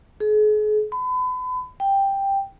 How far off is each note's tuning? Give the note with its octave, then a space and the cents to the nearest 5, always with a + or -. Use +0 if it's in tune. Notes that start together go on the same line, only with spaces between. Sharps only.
G#4 +40
B5 +35
G5 +5